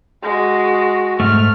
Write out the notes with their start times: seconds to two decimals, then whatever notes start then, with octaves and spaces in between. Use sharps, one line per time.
0.23 G#3 F#4
1.20 G#2 A3 F6